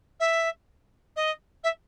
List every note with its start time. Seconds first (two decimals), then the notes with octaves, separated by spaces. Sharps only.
0.20 E5
1.16 D#5
1.63 E5